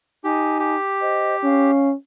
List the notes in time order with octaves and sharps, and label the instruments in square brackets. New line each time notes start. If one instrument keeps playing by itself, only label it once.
[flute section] D#4 G#5 [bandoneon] G4
[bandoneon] G4
[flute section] C5 D#5
[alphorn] C#4 [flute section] F5